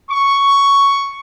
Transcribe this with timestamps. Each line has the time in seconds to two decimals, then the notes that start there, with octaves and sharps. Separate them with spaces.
0.11 C#6